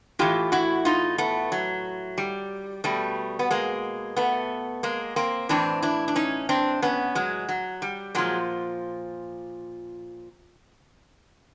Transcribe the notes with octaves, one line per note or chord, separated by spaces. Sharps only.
A2 E3 F4 G4
E4 F#4
D#4 F4
A3 B3
F#3
G3
B2 G3 A3
B3
G#3 A#3
A3 B3
G#3 A#3
A#3 C4
A2 E3 C4 D4
D4 E4
D4
C#4 D#4
C4 D4
B3 C#4
F#3 G#3
F#3
G3
A#2 F3 F#3 G#3